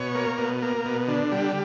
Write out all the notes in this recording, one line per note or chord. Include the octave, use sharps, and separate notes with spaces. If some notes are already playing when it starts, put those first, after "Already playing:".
Already playing: B2 C#5
A#3
B2
A#3
B2
D3
G3